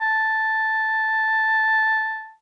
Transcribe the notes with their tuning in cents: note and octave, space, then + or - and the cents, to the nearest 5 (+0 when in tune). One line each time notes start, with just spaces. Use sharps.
A5 +0